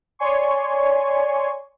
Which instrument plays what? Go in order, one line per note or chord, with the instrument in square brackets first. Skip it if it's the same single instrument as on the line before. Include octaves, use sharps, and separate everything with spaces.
[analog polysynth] C#5 D5 G#5 C6 C#6